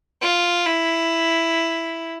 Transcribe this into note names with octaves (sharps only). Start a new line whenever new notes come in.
F4
E4